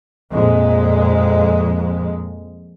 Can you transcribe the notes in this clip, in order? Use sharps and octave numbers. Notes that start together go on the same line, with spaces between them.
F2 A#2 G#3